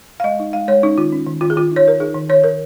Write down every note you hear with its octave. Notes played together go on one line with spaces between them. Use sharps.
F5
G#3 D#5
D#4
G#3 F5
G#3 C#5
C#4 D#4
D#3 F4
C#4
D#3
D#3 F4
G#4
D#3 F4
D#4
C#5
D#3 A#4
D#4 G#4
D#3
D#3 C#5
D#3 A#4